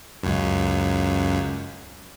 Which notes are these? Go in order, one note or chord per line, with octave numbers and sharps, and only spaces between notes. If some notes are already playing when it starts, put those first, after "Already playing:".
C#2 F#2